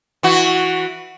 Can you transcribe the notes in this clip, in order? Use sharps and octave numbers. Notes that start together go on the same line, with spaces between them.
E3 F#4